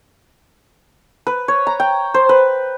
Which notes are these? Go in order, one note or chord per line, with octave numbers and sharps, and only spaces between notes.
B4
C#5
A#5
G5
C5
B4